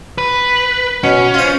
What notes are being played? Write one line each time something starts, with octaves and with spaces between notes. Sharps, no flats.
B4
B2 C#4
F4 C5